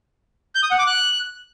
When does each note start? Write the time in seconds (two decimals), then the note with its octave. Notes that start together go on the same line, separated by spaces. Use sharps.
0.55 G6
0.63 D#6
0.71 F#5
0.79 D6
0.87 F#6